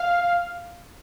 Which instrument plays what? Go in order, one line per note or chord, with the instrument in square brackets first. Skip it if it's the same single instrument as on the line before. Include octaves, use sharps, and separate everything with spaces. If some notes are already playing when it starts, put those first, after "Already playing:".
Already playing: [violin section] F5